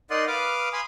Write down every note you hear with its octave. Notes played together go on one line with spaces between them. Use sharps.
D#4 A#4 D5 D#5 F#5 C6
B4 F5 D6 D#6 F6
G#5 B5 C6 D#6